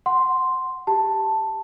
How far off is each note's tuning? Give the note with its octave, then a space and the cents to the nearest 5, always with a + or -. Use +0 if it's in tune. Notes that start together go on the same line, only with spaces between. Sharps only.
F#5 +0 C6 +0
G4 +0 A5 +5